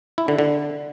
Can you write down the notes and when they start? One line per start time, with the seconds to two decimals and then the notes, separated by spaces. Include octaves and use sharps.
0.18 E4
0.28 D3
0.39 D3